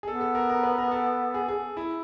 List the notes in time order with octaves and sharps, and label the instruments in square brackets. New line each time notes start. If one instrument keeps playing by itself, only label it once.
[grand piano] G#4
[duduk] B3 [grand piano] A4
[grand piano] A4
A#4
A#4
B4
A#4
A4
G#4
G#4
E4